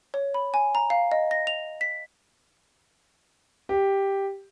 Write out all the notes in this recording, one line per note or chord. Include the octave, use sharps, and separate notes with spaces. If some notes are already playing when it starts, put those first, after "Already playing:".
C#5
B5
G#5
A#5
F5
D#5
A#6
F7
B6
G4